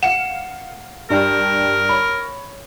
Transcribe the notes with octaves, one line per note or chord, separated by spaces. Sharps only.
F5 F#5 C#7 E7
G2 D4 G4 A#4
C#5 B5